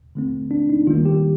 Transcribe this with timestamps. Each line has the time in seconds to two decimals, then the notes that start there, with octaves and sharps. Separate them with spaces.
0.15 D3 A3 C4
0.51 D4
0.70 D#4
0.87 D#3 G3 A#3 F4
1.05 G4